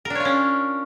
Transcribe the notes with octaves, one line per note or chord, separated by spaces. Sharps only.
C#4 D4 F4 A#4 C#5